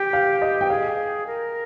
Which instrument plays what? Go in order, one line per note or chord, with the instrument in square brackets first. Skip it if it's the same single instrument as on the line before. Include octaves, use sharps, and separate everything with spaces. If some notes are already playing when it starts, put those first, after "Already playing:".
Already playing: [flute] G4 [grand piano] G5
[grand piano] F5
D#5
G5
[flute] G#4 [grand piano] F5
[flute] A#4